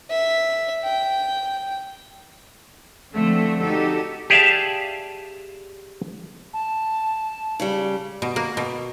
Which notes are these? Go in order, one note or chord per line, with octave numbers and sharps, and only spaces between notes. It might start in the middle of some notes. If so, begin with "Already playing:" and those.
E5
G5
D3 F3 A3 C4
D#4 F#4 G4 A4 D5
G4 G#4 D5 E5 F5 A5
A5
C#3 G3
B2
A#3
B2